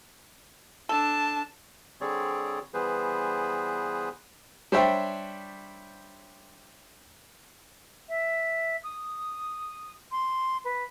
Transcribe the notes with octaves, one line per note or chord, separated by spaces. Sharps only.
D4 A4 A5
D3 G3 C4 G#4 C#5 D5
E3 G3 B3 G#4 B4 C5
G3 D4 C5 C#5 E5 G5
E5
D#6
C6
B4